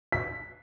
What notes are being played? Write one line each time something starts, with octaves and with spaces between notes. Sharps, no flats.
B6